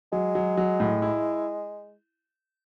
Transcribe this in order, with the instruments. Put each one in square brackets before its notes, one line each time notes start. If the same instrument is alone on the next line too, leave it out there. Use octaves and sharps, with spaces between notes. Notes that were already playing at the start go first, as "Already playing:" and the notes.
[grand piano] F#3 [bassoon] G#3
[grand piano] F#3
F#3
A2
E4